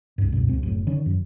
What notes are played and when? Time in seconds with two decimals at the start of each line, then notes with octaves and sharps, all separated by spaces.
0.18 C2 G2
0.32 C#2 F#2 B2
0.48 C#2 C4
0.63 F#1 A2
0.87 D3 D#3 C#4
1.06 F#2